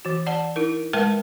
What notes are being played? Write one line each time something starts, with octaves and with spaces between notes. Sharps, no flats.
E3 F#4
D5 F#5 A5
D#4 E4 A#4
G#3 A#4 B4 E5 G5 A5